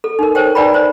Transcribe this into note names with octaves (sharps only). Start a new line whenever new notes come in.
A4
D#4 A#4
A#4 C5 C#5 G5
D#4 B4 D5 G5 A#5 B5
C5 D5 B5